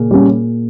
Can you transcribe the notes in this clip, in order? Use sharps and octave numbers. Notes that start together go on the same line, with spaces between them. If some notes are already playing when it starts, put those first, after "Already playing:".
Already playing: A#2 C#3
G3 C#4